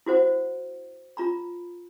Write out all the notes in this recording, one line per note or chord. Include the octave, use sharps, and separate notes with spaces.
E4 F#4 C5 F#5
F4 A#5 B5